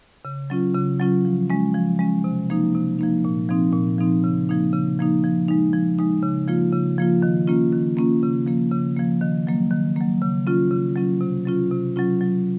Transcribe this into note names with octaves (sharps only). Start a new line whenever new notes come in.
C#3
F#3 C#4 F4
C#3
F#3 C#4 F4
F3
G#3 C#4
F3
G#3 C#4
C3
F3 A#3 D#4
C3
F3 A#3 D#4
A#2
F3 C4 D#4
A#2
F3 C4 D#4
C#3
F3 A#3 D#4
C#3
F3 A#3 D#4
F3
G#3 D#4
F3
G#3 D#4
C#3
F3 A#3 F4
C#3
F3 A#3 F4
D#3
A#3 C#4 F4
D#3
A#3 C#4 F4
C#3
F3 A#3
C#3
F3 A#3
D#3
F#3 A#3
D#3
F#3 A#3
C#3
F#3 C#4 F4
C#3
F#3 C#4 F4
C3
F#3 C#4 F4
C3
F#3 C#4 F4
F#3